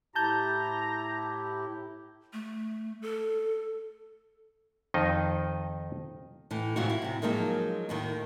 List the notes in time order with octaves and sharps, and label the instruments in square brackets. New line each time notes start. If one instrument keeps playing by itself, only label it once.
[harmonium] A2 E4 G4 [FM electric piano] A5 G6 [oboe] A#5
[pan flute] A3
A4
[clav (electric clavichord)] F2 D#3 D#4 D#5
[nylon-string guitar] A2 E3
G#2 C3 E3 F#3 F4 F#4
E4
A2 C3
F3 F#3 G#3 A#3 D#4
D#2 A2 D#3